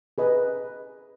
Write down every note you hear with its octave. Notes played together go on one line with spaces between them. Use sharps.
G#4 B4 D#5